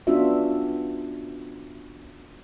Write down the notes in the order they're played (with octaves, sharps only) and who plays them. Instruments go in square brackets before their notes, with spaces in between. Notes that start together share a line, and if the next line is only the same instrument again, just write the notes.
[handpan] B3 C#4 D4 F4 F#4 E5